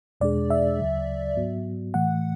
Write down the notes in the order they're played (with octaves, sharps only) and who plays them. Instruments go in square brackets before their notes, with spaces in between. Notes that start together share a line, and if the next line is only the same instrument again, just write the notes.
[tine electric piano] E2 B2 G#3 D4 G#4 [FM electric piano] D5
[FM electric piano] E5
[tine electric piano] D2 C#3 F#3
G#2 F#3 B3 F#4
[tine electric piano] A2 E3 A3 [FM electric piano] F#5